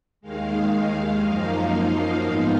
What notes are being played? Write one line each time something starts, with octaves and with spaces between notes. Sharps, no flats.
D#2 D#3 G#3 F5
F#2 F3 A#3 D#4 F5
F5
G#2 F3 B3 D#4